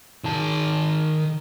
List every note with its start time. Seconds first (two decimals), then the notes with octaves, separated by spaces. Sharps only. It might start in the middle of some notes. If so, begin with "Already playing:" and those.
0.24 D#3 A5